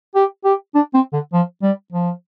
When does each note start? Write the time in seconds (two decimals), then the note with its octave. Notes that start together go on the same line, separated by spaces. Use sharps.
0.15 G4
0.44 G4
0.75 D4
0.94 C4
1.13 D3
1.33 F3
1.62 G3
1.92 F3